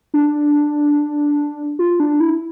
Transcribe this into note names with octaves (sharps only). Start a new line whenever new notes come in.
D4
F4
D4
E4